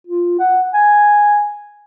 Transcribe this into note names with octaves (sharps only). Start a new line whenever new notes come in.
F4
F#5
G#5